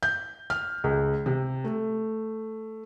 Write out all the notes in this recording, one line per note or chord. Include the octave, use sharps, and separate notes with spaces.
G6
F6
C#2
C3
A3